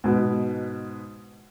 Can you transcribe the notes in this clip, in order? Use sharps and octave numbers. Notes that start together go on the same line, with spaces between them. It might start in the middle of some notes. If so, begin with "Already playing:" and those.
G#2 B2 B3